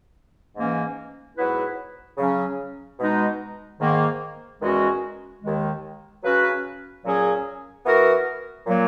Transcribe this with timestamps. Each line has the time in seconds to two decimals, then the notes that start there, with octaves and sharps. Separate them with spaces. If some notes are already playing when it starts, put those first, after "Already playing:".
0.55 G#2 E3 A#3 C#4
1.36 G#2 F#3 B3 E4 B4
2.17 C#3 F#3 C#4
2.98 B2 G#3 D#4
3.80 G#2 D#3 A#3
4.61 E2 D#3 G#3 C#4 F#4
5.42 D#2 D#3 G#3
6.23 C#3 F#3 C#4 F#4 B4
7.04 A#2 F#3 C#4 G#4
7.85 E3 B3 F#4 A#4
8.66 A#2 F#3 A#3